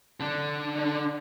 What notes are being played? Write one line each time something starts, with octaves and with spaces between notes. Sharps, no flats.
D3 D4